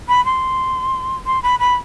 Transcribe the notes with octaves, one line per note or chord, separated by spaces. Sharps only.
B5
C6
C6
B5
B5